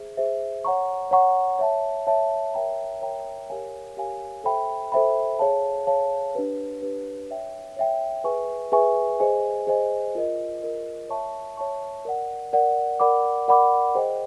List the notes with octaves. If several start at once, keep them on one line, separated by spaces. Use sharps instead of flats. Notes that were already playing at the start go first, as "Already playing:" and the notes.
Already playing: G#4 C5 E5
G#4 C5 E5
C#5 F#5 A#5 C#6
C#5 F#5 A#5 C#6
C#5 E5 A5
C#5 E5 A5
A#4 C#5 E5 G5 A#5
A#4 C#5 E5 G5 A#5
G4 A#4 C#5 F5 G#5
G4 A#4 C#5 F5 G#5
A4 C5 E5 G5 B5
A4 C5 E5 G5 B5
G#4 C#5 F5 A5
G#4 C#5 F5 A5
D4 G4 B4
D4 G4 B4
C#5 E5 G5
C#5 E5 G5
G#4 B4 E5 G#5 C#6
G#4 B4 E5 G#5 C#6
G#4 C5 D#5 G#5
G#4 C5 D#5 G#5
F4 A#4 D#5
F4 A#4 D#5
C#5 E5 A5 C#6
C#5 E5 A5 C#6
A#4 D5 F#5
A#4 D5 F#5
A#4 D5 F#5 B5 D6
A#4 D5 F#5 B5 D6
G#4 C5 D#5 G5